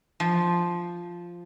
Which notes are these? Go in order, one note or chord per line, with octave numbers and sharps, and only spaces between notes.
F3